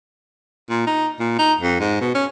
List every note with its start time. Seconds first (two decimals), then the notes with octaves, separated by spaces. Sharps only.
0.70 A#2
0.87 D#4
1.19 A#2
1.39 D#4
1.61 F2
1.80 G#2
2.01 B2
2.15 C#4